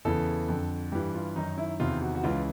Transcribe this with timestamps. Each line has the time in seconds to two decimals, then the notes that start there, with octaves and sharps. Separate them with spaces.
0.05 E2 C#3 E3 A4
0.48 F2 D3
0.92 G2 E3 G4
1.14 F4
1.36 F#2 D#3 D#4
1.58 E4
1.80 E2 C3 D#3 F4
2.02 F#4
2.15 F#4
2.24 C#2 C#3 E3 F4